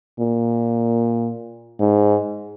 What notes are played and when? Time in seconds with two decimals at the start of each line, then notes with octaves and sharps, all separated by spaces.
0.19 A#2
1.80 G#2